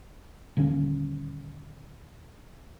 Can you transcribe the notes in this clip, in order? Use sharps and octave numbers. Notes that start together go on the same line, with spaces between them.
D#1 D3 C4 C#4